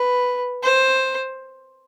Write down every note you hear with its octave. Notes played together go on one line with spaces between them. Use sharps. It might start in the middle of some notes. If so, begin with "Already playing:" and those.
Already playing: B4
C5